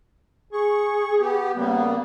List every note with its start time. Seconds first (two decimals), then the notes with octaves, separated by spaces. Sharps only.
0.53 G#4 C#6
1.20 B3 G4
1.56 C#3 G3 A#3 B3